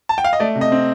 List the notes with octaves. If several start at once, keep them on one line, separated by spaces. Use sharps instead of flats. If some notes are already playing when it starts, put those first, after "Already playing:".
A5
G5
F5
D#5
A3 D5
C3
D#5
C4